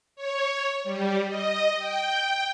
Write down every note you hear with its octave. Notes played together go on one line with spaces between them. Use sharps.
C#5
G3
D#5
G5